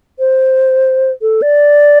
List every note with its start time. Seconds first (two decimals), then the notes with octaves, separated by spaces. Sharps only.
0.19 C5
1.22 A4
1.42 D5